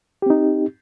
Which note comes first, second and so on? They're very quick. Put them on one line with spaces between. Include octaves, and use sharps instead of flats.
G4 C4 D#4